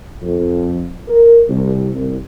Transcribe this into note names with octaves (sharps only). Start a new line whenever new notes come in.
F2
A#4
C2
C2